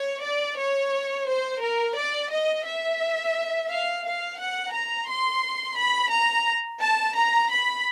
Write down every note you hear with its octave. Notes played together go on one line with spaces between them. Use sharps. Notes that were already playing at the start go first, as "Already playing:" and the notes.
Already playing: C#5
D5
C#5
C5
A#4
D5
D#5
E5
F5
F5
F#5
A#5
C6
B5
A#5
A5
A#5
B5